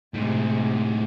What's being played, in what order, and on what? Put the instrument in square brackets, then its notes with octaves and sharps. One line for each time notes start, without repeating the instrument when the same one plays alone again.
[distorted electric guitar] A2 D#4 [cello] C3 G#3